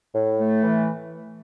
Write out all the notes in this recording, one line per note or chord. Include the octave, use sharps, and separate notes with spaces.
A2
A3
E3